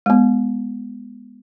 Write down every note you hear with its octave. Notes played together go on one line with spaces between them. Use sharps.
G#3 B3